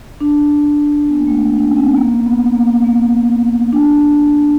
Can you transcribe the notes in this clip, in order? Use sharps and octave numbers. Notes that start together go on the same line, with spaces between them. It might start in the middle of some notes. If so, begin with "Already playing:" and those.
D4
B3
A#3
A3
A#3
D4
C#4
C4
B3
A#3
B3
A#3
A#3
D4